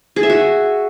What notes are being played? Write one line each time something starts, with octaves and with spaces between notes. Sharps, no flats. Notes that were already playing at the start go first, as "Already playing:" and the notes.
G#4
E5
F#4